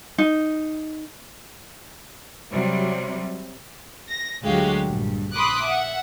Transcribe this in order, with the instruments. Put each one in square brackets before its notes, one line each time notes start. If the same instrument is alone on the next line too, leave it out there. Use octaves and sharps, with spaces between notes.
[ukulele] D#4
[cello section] C3 F#3 G3
[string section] A#6
D2 F#3 G#3 F#4 G4 F5
A#1 G2
B5 C6 D6 D#6 F#6
E5 F#5